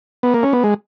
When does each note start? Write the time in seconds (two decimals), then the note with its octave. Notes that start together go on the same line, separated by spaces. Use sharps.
0.23 B3
0.34 A#3
0.43 C#4
0.53 B3
0.64 G#3